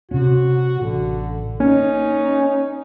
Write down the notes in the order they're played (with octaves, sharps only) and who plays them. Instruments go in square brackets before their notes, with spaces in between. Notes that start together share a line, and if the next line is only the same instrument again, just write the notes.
[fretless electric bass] C3 C#4 [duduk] F#4
[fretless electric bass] A1 [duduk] D3
[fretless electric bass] A#3 [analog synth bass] C#4 [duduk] D#4